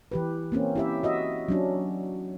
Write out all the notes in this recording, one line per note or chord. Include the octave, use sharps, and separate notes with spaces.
E3 G4 B4
A#3 C4 C#4
E4 G4 E5
F#4 D#5 E5
F#3 C#4 D4